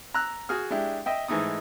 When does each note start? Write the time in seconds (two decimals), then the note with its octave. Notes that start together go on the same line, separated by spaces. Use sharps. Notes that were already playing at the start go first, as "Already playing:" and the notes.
0.14 A#5 E6 F#6
0.49 F#4 G#4 D#6 F6
0.70 G#3 D4 E4 G4
1.06 D#5 E5 G5
1.28 G#2 E3 G#3 A3 D#4 D#6